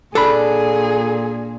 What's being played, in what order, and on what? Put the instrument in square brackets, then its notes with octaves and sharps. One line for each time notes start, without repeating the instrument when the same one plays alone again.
[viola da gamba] A#2 [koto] D4 [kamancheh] G#4 [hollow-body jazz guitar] A4 B5